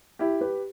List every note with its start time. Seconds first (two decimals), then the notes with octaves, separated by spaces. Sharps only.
0.19 E4 G4
0.41 G4 B4